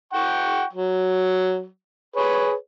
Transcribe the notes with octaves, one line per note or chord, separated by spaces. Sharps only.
F#5 G5 C#6
F#3
G#4 B4 C#5